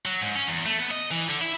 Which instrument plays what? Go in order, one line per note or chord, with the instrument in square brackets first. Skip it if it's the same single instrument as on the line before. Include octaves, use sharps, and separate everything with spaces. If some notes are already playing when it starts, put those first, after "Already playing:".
[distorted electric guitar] F#3
G#2
C#4
E2
A3
B3
D#5
E3
D3
E4